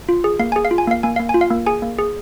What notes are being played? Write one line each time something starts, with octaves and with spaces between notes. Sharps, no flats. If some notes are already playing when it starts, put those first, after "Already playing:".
F4
G#4
A#3 F5
G#4 G#5
F5
F4
G#5
A#3 F5
A#3 G#5
A#3 F5
G#5
F4
F5
A#3
G#4 G#5
A#3
G#4